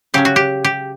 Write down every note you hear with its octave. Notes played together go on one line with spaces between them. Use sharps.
C#3 F#3 C#4 G4
F#4
G4
G4